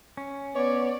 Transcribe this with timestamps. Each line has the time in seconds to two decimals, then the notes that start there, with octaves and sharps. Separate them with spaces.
0.17 C#4
0.55 B3 C#5 D5